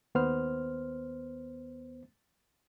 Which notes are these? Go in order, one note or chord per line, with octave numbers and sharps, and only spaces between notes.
D#2 B3 C5 F6